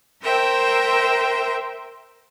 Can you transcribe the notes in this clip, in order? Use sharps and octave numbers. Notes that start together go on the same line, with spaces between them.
A#4 C5 E5 G5